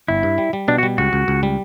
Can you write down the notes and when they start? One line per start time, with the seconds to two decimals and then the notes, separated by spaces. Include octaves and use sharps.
0.08 G1 E4
0.23 G2
0.38 G3
0.53 G3
0.68 B2 D4
0.78 F#4
0.83 G3
0.98 C#2 F#4
1.13 C#2
1.28 C#2
1.43 G3